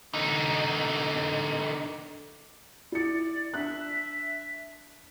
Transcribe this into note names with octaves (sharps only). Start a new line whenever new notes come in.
D3 D#4
E4 D5 C#7
D4 E5 F#6